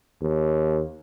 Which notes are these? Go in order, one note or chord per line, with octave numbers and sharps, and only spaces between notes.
D#2